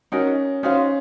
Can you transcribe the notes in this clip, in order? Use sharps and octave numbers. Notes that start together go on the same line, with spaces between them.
C#4 D#4 F#4 A#4
C#4 D#4 F#4 C5 F5